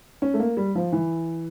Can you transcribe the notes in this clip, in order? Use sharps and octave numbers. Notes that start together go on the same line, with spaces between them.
C#4
A3
A#3
G3
F3
E3